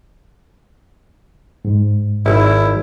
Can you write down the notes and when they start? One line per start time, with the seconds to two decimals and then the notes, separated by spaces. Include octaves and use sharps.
1.65 G#2
2.26 G#1 E4